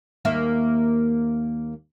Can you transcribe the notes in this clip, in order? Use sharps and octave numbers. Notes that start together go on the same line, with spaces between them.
D#2 A#3 E5